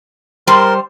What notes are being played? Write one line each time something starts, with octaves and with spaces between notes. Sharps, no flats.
G3 A#4 C5 C6